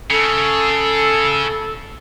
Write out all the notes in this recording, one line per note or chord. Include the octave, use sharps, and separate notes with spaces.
C#3 A4